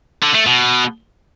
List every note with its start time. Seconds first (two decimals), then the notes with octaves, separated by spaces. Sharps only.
0.22 D3
0.34 A3
0.46 B2